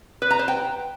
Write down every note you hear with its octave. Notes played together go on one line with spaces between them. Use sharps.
B4
A#5
C5
G5